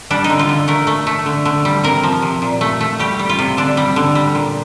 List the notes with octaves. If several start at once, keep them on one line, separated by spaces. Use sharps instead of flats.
G3 D4
D#4
D3
F4
D3
A3 A#4
A3
A3
D3
D3
G3
C3 A#4
F3
C3
A#2
A3
A3
G3 G4
G3
F4
C3
D3 D4
G3
D3
G3
A#2